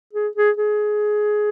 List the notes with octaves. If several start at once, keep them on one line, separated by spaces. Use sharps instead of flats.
G#4
G#4
G#4